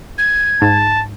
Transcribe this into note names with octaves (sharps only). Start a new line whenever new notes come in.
G#6
G#2 A5